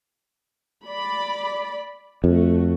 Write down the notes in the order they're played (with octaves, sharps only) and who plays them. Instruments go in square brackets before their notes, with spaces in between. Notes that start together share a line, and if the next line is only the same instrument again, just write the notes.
[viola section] D5 B5
[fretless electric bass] F2 [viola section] A3 F#4